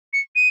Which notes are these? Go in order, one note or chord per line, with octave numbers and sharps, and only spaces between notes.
C#7
D#7